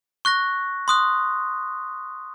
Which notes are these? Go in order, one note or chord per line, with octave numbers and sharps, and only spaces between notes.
C#6 F#6 A#6
C6 D#6 F#6